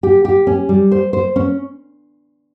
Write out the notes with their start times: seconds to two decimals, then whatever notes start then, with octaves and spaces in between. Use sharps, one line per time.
0.03 G4
0.25 G4
0.47 C#4
0.69 G3
0.91 C5
1.13 C5
1.36 C#4